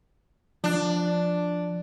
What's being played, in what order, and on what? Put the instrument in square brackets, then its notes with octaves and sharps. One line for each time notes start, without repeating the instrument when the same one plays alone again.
[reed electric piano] F3 F#6 [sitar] D4